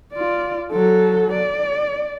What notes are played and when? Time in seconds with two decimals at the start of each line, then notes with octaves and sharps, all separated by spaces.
0.13 F4 D5
0.72 F#3 A4
1.33 D5